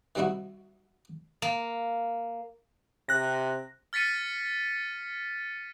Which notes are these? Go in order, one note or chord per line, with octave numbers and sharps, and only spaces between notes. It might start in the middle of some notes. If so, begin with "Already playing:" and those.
D#3 G3 C4 D#4 E4 F#4
A#3
C3 F#6 A#6
F6 A6 B6 C#7 D#7